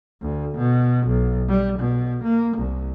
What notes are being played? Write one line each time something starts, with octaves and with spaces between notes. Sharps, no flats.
D2
B2
B1
G3
B2
A#3
C2